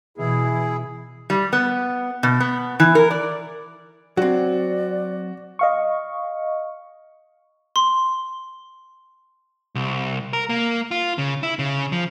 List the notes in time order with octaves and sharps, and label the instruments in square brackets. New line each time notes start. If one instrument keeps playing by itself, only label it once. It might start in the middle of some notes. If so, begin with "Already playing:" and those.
[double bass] B2 E3 [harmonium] E4 G#4
[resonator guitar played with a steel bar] G3
B3
B2
B3
E3
A#4
D5
[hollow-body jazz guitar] F#3 C4 [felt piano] F#4 [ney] D5
[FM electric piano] D#5 F5 C#6
[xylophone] C6
[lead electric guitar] C2
A#4
A#3
F4
C#3
E4
C#3
F3